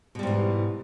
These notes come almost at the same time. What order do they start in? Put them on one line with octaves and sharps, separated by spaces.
B2 G3 G#2 E3